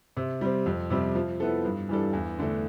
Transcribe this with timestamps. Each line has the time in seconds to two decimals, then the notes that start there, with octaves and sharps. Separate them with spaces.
0.17 C3
0.41 G3 C4
0.66 F2
0.90 C3 G3 C4
1.15 F3
1.40 B3 E4 A4
1.65 G2
1.89 E3 G3 D4 A4
2.13 E2
2.38 D3 A3 D4 A4